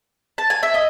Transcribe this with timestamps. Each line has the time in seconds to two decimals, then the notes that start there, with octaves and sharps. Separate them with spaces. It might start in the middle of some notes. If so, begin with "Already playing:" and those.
0.38 A5
0.50 G#5
0.63 E5
0.74 D#5